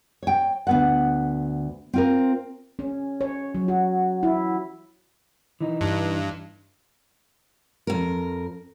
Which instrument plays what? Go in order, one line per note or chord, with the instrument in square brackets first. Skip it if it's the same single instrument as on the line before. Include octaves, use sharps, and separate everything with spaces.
[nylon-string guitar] C#5 G5
D2 B3 F#5
C4 F4 A#4
[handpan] C#4
C#5
F#3
F#4
E4
[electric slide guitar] E3 D#4
[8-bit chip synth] G2
[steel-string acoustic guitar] F2 A#4